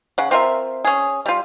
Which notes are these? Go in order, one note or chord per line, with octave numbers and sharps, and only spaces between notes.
C#3 F#5
C4 F4 A#4 E5
C#4 G#4
G3 F4